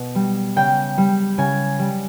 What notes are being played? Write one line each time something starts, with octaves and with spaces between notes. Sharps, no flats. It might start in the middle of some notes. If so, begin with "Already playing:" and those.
Already playing: B2
G3
C#3 G5
G3
C#3 G#5
G3